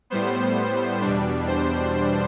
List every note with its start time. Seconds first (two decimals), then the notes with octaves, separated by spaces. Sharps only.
0.10 A2 G3 B3 C5
1.01 E2 B2 G3 D4
1.47 C5